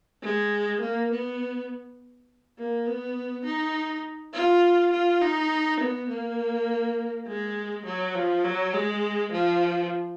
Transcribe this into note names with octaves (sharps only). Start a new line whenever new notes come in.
G#3
A#3
B3
A#3
B3
D#4
F4
F4
D#4
B3
A#3
G#3
F#3
F3
F#3
G#3
F3